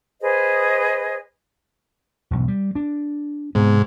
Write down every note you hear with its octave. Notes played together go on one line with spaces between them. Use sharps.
G#4 B4 C5 D#5
E1 B1
G3
D4
G#2 C3 B3